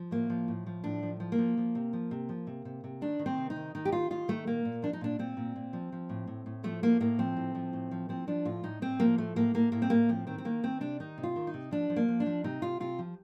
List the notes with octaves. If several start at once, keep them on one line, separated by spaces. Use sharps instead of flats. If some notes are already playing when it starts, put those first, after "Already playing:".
Already playing: F3
A2 A#3
F3
A2
F3
A2 D4
F3
F3
A#3
F3
F3
C3
F3
C3
F3
C3
C3
C3
D#3 D4
D#3
C4
C3
D#4
D#3
D#3 D#4
G4
D#3 F4
D#3 F4
D#3 A3
A#2 A#3
A#2
F3 D4
D#4
A#2 D4
A#2 C4
A#2
A#2
F3
F3
A2
A2
A2
F3 A3
A2 A#3
A2 A#3
F3 C4
A2
F3
A2
F3
F3 C4
F3 D4
A2 F4
A2 D#4
A2 C4
F3 A#3
A2 A3
A2 A#3
A2 A#3
A2 A#3
C4
A2 A#3
F3 C4
D#3 C4
C4
D#3 A#3
D#3 C4
C3 D4
D#3 D#4
C3
F4
D#3
D#4
C3
F3 D4
F3
A#3
F3
D4
F3
C3 D#4
C3 F4
C3 F4
F3